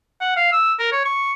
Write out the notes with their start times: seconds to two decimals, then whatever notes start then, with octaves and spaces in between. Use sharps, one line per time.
0.21 F#5
0.36 F5
0.52 E6
0.79 A#4
0.92 C#5
1.05 C#6